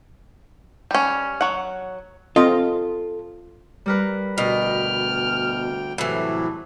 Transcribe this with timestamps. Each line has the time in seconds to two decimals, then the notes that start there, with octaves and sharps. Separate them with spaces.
0.91 G3 C#4
1.41 F#3 F#5
2.36 C4 F4 A4 D#5
3.86 G3 A#4 B4
4.38 D2 B2 G5 F6
5.98 A2 C3 E3 F#3